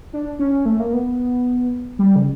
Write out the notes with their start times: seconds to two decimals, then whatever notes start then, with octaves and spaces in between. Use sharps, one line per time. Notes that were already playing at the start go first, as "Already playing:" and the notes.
0.13 D4
0.39 C#4
0.66 A3
0.79 A#3
0.93 B3
1.99 G3
2.16 C#3